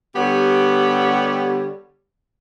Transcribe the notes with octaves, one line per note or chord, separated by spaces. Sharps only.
D3 G3 B3 G4 C#5